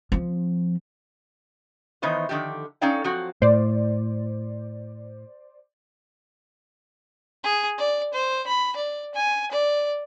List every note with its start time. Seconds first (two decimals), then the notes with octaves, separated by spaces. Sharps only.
0.12 F3 C4
2.02 D#3 E3 B3 D#4 C5 C#5
2.29 D3 D#3 F3 G4
2.81 C#4 D#4 A4 D5 F5 G5
3.04 F3 F#3 C4 F#4
3.42 A2 C5 D5
7.44 G#4
7.78 D5
8.13 C5
8.47 B5
8.76 D5
9.15 G#5
9.51 D5